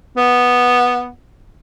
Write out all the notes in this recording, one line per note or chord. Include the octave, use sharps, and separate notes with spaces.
B3